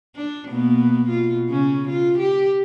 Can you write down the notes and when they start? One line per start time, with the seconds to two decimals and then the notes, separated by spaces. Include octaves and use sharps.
0.16 D4
0.49 B2 A#3 B3
1.09 B2 F4
1.50 C#3 C#4
1.88 F4
2.19 G4